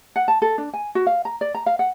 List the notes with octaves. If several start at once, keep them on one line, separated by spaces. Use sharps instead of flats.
F#5
A5
A4
D4
G#5
F#4
F5
A#5
D5
A#5
F5
F#5